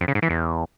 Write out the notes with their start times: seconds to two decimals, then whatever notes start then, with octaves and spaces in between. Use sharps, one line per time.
0.01 F2
0.08 C#3
0.15 G#2
0.22 E3
0.30 E2